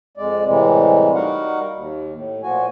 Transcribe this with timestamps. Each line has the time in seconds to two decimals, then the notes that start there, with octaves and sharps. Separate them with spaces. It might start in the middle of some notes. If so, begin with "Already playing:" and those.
0.17 F2 G#3 D5
0.46 A2 C3 E3 G3 G#3
1.15 G3 D#4 F#4 A#4 F5 F#5
1.73 D#2
2.15 A2
2.43 A#2 F3 F#4 G#5